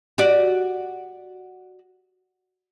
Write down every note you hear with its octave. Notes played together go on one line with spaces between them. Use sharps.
F#4 G4 D5